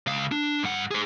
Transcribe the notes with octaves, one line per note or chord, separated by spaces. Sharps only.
C#2 F5
D4
G2 F#5
G#4 C5